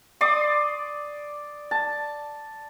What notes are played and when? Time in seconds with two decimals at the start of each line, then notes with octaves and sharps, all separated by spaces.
0.21 D5 C6 D6 D#6
1.71 A5